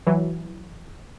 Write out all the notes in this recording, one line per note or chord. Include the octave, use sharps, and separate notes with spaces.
E3 F#3